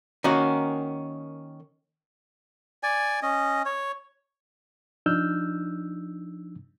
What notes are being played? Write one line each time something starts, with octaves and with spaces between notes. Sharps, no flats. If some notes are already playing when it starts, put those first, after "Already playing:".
D#3 A#3 C#4 F#4
D5 G#5
C#4 D#5
C#5
F3 D4 D#4 E6 F6 G6